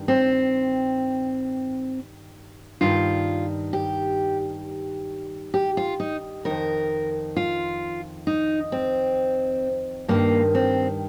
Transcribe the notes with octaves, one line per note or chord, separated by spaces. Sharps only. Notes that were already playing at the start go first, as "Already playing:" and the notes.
Already playing: G2 D#3
C4
G2 D#3 F4
G4
G4
F4
D#4
F2 D#3 A#4
F4
D#4
C4
G2 D#3 A#3
C4